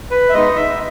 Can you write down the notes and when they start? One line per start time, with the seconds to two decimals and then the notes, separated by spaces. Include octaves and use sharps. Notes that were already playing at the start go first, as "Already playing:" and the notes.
0.11 B4
0.29 E5
0.33 G#3 B3 D#4 D#5
0.56 E5